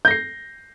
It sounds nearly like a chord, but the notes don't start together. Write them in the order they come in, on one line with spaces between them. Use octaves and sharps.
G6 A#6 C7